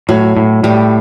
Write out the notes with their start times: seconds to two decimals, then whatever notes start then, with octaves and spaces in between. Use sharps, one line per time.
0.09 A2 F#3
0.37 A2
0.63 A2 G3